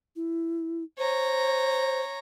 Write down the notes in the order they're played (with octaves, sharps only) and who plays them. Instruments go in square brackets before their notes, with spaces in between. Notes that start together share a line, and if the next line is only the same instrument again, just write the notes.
[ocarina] E4
[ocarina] C5 [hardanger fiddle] C#5 A#5